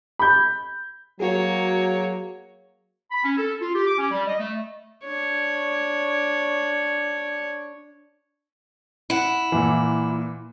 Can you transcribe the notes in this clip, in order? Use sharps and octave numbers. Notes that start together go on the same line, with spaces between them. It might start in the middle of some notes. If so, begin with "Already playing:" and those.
B5 G6
F#3 A#3 F#4 G#4 C#5
B5
C#4
A4
F4
G4
D6
C#4
G3
D#5
A3
D4 C#5
E4 F#5
A#2 E3